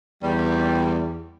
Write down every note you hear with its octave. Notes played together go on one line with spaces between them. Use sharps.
E2 G3